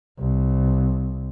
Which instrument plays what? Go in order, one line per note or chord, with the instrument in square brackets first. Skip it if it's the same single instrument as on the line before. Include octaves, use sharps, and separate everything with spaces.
[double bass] C2